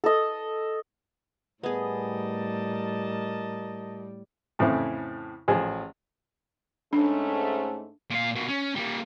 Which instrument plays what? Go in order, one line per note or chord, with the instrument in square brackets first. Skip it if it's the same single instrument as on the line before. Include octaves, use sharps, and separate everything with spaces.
[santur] A4 D#5
[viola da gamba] A2 G3 [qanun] B3 G#4 [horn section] A#4 D#5 A5
[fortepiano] F2 A2 C#3 E3 C4 E4
A1 F3 G#4 G#5
[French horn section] G#2 A3 C#4 [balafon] D4
[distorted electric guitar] A#2 F5
B2 A#3
C#4
G3 A#3